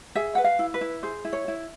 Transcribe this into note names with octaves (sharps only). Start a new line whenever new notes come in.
G#4 E5
B4 F#5
F5
E4
B4
E4
G#4 C5
E4
C#5
E4